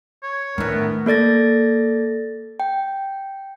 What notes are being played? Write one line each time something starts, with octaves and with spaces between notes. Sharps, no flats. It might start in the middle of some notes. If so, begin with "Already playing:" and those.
C#5
E2 A2 D#3 B3 D4 A#4
A#3 A4 D5 A6 A#6
G5